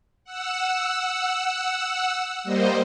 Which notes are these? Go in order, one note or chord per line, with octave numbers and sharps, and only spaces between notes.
F#5 E6
G3 A#3 C5 D#5